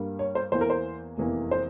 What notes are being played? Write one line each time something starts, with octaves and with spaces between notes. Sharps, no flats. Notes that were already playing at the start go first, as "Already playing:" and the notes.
Already playing: G2 G3 A#3
C#5
C5
E2 E3 A#3 C5
A#4
C5
F1 E2 E3 A#3
C5